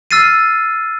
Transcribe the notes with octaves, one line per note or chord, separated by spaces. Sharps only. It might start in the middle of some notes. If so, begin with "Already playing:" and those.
E6 F6 A6 C7 D#7